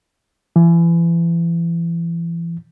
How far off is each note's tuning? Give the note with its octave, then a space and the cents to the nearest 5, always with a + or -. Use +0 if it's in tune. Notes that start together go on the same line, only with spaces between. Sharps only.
E3 +35